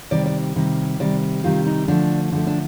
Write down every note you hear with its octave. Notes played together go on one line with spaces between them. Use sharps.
C3 D#3 G3 D5
D5
C3 D#3 G3
C3 D#3 G3 D5
C3 D#3 G3 F4
D#4
D3 F3 A3 D4
D3 F3 A3 D4
D4